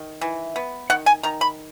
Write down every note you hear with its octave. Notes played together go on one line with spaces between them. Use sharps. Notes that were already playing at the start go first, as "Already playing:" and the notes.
Already playing: D#3
E3
B3
D#3 F#5
G#5
D#3 A#5
B5